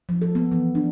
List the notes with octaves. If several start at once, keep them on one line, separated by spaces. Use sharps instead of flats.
F3
A4
B3
E3
D4